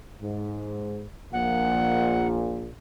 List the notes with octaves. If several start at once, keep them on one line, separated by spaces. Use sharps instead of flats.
G#2
A#1 A#2 F#5